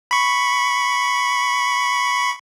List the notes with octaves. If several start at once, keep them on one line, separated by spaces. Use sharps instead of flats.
B5 C#6